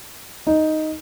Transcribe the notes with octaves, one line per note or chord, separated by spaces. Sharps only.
D#4